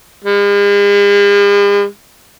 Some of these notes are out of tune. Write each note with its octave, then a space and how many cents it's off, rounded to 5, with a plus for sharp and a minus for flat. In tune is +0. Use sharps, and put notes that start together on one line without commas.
G#3 -45